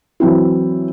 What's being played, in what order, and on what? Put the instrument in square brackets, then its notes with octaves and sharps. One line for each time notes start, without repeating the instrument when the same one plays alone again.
[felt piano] E3 F#3 C4 E4